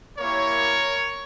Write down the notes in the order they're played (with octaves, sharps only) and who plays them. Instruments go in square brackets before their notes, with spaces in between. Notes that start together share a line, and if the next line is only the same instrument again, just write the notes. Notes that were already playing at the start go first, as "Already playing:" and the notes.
[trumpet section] A#3 E4 G4 A#4 C#5